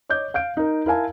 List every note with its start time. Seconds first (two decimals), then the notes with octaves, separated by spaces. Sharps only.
0.09 C#5 D#5 D6 G6
0.34 F5 G6 D7
0.57 D#4 A#4
0.86 E4 A#4 F5 G#5 A5